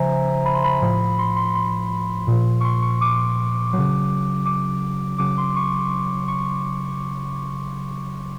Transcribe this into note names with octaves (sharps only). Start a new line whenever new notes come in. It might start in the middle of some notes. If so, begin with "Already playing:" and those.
Already playing: C#3 F3 C5 E5 G#5 A#5
B5
C6
B5
A2 F3
C6
C6
C6
A#2 F3
C#6
C6
C#6
D6
C#3 F#3
D6
C#3 F#3 D6
C6
C#6
C#6